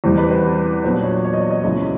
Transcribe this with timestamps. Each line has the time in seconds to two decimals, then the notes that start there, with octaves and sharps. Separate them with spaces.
0.04 E2 C3 E3 G3 C5
0.18 B4
0.31 C5
0.84 A#2 F#3 B3 D4 C5
1.04 C#5
1.25 C#5
1.33 D#5
1.37 D5
1.51 D#5
1.64 C#2 C#3 F#3 B3 E4